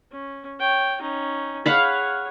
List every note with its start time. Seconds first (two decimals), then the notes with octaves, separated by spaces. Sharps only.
0.11 C#4
0.59 C#5 G5
1.01 C#4 D#4
1.66 G#4 C#5 F5 F#5 B5